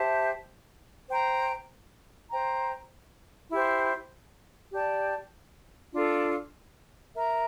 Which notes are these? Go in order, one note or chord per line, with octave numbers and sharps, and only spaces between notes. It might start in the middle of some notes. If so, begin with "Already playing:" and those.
Already playing: G4 C5 E5 A5
C5 G5 A#5
C5 G5 A#5
E4 G4 C5
G4 D5 A5
D4 F4 A4
A#4 E5 A#5